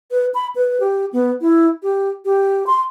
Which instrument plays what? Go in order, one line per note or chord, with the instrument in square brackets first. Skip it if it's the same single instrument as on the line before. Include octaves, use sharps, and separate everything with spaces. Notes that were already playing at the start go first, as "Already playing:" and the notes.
[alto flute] B4
B5
B4
G4
B3
E4
G4
G4
C6